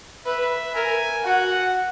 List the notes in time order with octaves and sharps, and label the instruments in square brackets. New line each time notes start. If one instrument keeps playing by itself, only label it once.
[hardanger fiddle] B4 [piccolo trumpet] E5
[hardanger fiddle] A#4 [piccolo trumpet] G#5
[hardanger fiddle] F#4 [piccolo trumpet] F#5